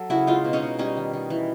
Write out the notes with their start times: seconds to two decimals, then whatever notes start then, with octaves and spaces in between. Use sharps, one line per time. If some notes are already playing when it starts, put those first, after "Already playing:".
Already playing: F#3 A4
0.10 C#3 E4 F#4
0.27 G#3 D#4 F4
0.45 B2
0.53 C#4 D#4
0.62 B2
0.79 G3 C#4 D#4
0.96 D#3
1.13 D#3
1.30 E3